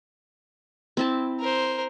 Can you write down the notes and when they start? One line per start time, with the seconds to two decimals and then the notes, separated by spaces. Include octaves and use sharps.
0.97 C4 E4 A5
1.40 A#4 C5